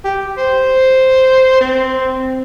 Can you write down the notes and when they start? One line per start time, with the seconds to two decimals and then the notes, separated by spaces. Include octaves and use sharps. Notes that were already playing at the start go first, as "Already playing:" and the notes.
0.04 G4
0.38 C5
1.61 C4